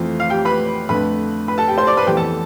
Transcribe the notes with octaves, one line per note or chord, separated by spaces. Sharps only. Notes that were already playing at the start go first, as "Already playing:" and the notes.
Already playing: F2 E3 A3 C4 F4
F5
G4 G5
B4 B5
F2 D3 A3 B4 B5
B4 B5
A4 A5
G4 G5
C5 C6
D5 D6
B4 B5
F2 E3 B3 G4 G5
A4 A5